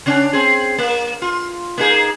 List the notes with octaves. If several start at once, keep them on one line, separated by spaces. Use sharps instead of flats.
C#3 C#4 D4
C4 G#4
A#3
F4
A#3 D#4 G#4